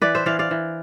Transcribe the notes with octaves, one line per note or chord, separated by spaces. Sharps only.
E3 B4 D5
C5 E5
E3 D5 F5
D5 F5
E3